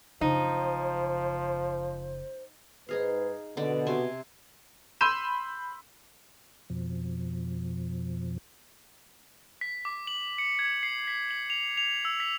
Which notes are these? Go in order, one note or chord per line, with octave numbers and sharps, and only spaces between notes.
F#1 C#3 F3 D#4 C5
G#2 D#4 G#4 B4 F5
B2 D3 D5
C3 C5 G#5
B5 C6 E6 G6 D#7 E7
F2 B2 F3
B6
D6
F#7
C#7
G#6
C7
B6
F#7
F7
F7
E6
B6